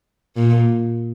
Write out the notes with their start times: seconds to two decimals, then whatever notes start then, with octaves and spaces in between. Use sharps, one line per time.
0.36 A#2